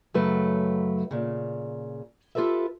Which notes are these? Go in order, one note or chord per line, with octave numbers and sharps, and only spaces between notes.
F#2 C#3 F#3 A3 B4
A#2 C#3
F4 G4 A4 B4 E5